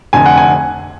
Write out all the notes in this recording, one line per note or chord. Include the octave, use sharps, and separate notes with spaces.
F1 F2 D3 G#5
F#5
G#5